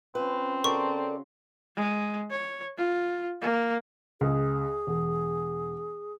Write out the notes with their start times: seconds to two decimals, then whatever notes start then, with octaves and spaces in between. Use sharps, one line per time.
0.15 F3 C4 C#4 B4
0.64 C#3 F#4 A4 A#4 D5 C6 C#6
1.77 G#3
2.31 C#5
2.77 F4
3.42 A#3
4.21 C#2 G#4
4.87 E1